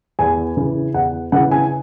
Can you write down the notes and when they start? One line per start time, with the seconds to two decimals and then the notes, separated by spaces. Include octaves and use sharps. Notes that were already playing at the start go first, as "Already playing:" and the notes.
0.19 E2 G#5
0.57 C#3 E3
0.94 E2 F#5
1.32 C#3 E3 F#5
1.51 G#5